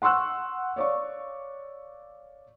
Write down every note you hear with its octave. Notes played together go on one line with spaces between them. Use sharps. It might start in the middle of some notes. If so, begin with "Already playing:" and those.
F#5 C6 C#6 E6 F#6
C#5 D5 F5 C#6